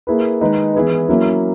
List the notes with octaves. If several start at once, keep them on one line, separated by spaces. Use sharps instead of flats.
A#3 E4 G#4 B4
D#3 G#3 D#4 G#4 B4
E3 B3 E4 G#4 B4
F#3 A#3 C#4 E4